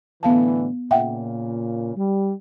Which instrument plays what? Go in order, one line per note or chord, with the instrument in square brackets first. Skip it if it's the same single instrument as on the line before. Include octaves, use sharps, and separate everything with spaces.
[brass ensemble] A2 D3 E3 [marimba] B3 F5 A5
[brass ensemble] A#2 C#3 [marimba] E5 F#5 G5
[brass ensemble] G3